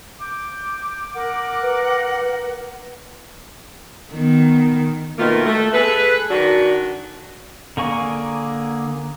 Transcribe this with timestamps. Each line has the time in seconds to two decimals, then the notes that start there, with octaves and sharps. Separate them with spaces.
0.21 D6 G6
1.14 A#4 F#5
1.62 B4
4.13 D#3 B3
5.18 B2 D#3 A3 A#3 F4
5.45 A3
5.73 G#4 A4 B4
6.30 D#3 D4 F#4
7.77 D3 A#3 G#4 C#6